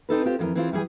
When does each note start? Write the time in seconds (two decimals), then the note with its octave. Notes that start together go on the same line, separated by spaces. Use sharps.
0.09 C4 D#4 A4 B4
0.25 C4 F4 G4
0.39 F2 E3 F4 A#4
0.55 E3 C4 F4 G#4
0.72 E3 G3 C4 G#4 G#5